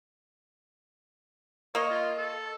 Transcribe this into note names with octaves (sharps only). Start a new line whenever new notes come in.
A#3 C#5 D#5
F4
A4